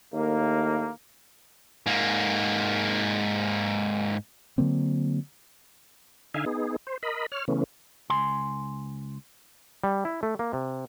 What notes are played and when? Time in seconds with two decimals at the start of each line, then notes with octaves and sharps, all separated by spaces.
0.14 D#2 A2 A#3
1.86 G#2 A#3
4.58 D3 F#3 A#3 C4
6.34 D3 D#4 E5 F5 G#5
6.46 B3 D#4 G#4
6.87 C5
7.03 A#4 D#5 B5
7.32 C#5 F6
7.48 C#3 E3 A3 B3 C#4
8.10 C#2 G#5 C6
9.84 G3
10.05 E4
10.23 A3
10.39 A#3
10.53 C3